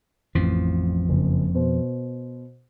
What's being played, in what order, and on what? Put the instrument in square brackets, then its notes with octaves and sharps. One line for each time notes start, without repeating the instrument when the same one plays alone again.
[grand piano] A1 [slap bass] F2 F3
[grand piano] F#1
B2 C5